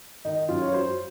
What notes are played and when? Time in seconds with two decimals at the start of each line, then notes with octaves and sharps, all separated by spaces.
0.25 D#3 D#4
0.49 F#2 F4
0.62 C#5
0.73 F#3 C5